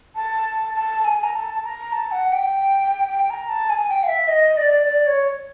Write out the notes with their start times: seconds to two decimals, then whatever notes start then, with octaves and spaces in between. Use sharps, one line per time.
0.16 A5
0.75 A5
1.04 G#5
1.24 A#5
1.34 A5
1.54 A5
1.63 A#5
1.92 A5
2.12 F#5
2.32 G5
3.10 G5
3.30 A#5
3.49 A5
3.70 G#5
3.89 G5
4.03 F5
4.08 E5
4.28 D#5
4.57 D5
4.86 D5
5.07 C#5